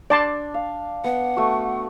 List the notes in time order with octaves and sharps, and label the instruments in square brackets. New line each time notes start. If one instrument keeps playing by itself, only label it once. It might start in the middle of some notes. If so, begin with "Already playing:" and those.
[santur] D4 [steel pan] D5 A5 C6
[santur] F5
[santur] B3 [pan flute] F#5
[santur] A3 F#4